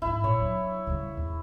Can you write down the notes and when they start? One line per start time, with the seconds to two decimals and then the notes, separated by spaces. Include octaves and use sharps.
0.02 G#2 B3 E4
0.24 A#2 C#5
0.39 F#3 D4
0.87 C#3 G3
1.17 E2